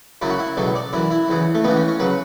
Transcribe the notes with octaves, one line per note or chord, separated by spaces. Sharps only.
F#2 C#3 F#3 E4
F#4
E4
C#2 B2 F#3 A4
D5
F#2 E3 E4
E4
E2 C#3 E3
A3
C#2 C#3 E3 B3
C#4
C#4
C#3 F#3 B4